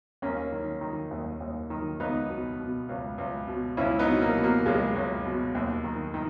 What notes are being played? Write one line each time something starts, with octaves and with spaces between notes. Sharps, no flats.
D#2 A#3 C#4
D#3
D#3
D#2
D#2
D#3
C#2 B3 D#4
B2
B2
C#2
C#2
B2
C#2 C#4 E4
B3 D#4
B2
A#3
B2
A#3
C#2 G#3
C#2
B2
D#2
D#3
D#3